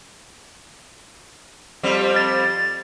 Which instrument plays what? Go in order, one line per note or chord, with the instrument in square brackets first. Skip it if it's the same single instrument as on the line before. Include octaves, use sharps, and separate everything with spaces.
[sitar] F2 G3 C4
[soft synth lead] A6